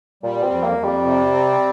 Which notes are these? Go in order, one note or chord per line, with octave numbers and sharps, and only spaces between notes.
A#2 G3
C4
F2
A#3
F2
G3
C3
C4